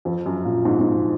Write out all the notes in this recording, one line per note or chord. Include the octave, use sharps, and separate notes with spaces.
F2
F#2
A#2
G#2
G#2